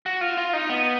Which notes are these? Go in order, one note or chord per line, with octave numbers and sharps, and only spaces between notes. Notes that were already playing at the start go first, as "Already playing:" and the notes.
F#4
F4
F4
D#4
B3